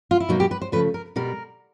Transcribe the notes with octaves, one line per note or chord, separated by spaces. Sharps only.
F4
E4
B2 F#3 A#3 D#4
G4
B4
C5
C#3 F3 A3 B4
A#4
B2 G3 B3 A#4